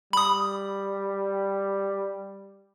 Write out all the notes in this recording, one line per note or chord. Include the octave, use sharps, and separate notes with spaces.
G3 B5 D#6